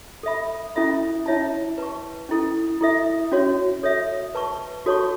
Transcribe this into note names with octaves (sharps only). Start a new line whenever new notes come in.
A4 E5 B5
C#4 E4 A4 E5 B5
C#4 E4 C#5 E5 A5
B4 A5 C#6
C#4 E4 A4
E4 A4 E5
C#4 F#4 C#5
A4 C#5 E5
B4 A5 C#6
F#4 A4 C#5 A5 C#6